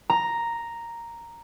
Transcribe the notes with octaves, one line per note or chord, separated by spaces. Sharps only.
A#5